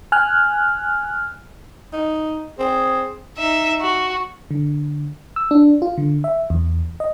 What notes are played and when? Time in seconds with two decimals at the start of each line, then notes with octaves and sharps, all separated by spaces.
0.12 G#5 F6 F#6
1.93 D#4
2.59 C4 G#4
3.37 D#4 E5
3.81 F#4
4.51 D3
5.36 E6
5.51 D4
5.82 F4
5.98 D3
6.24 E5
6.50 E2
7.00 D#5